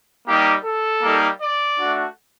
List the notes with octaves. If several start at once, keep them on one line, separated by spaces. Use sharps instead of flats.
G3 A#3 D#4 G4
A4
G3 A#3 D#4
D5
A3 D4 F#4